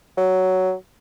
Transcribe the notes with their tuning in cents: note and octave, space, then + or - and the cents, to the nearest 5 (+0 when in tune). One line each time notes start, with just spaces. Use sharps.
F#3 +10